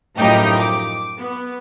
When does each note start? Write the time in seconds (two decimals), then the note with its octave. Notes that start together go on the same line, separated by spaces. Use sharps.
0.18 F#2 A2 F3 D#4 G4 A#5
0.57 D6
1.19 B3